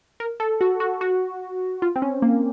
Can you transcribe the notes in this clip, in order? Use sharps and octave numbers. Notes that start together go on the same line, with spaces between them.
A#4
A4
F#4
F#4
F#4
F4
C4
C#4
A#3